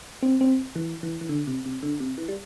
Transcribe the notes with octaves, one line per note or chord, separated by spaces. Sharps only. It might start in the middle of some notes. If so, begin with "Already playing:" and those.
C4
C4
E3
E3
E3
D3
C3
C3
D3
C3
E3
G3